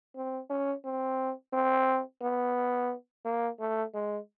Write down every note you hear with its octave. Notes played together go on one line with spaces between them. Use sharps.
C4
C#4
C4
C4
B3
A#3
A3
G#3